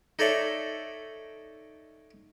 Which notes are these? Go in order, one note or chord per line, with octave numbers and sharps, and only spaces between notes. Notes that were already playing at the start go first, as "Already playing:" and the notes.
D#4 A4 C#5 D5 E5